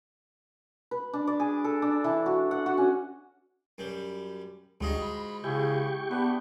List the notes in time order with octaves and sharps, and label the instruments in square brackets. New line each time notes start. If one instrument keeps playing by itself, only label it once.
[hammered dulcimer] B4
D4
D5
G#4
A4
D4
E3
F#4
F#5
F#4
C#4
[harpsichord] F#2 G3
[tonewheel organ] D2 G3 [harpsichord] G#2 F4 F#4 [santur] D#5 C6
[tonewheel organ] B5
[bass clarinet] C#3 [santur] E4 G#4 [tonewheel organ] G4 G5 C#6
[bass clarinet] B3 [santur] D4 B4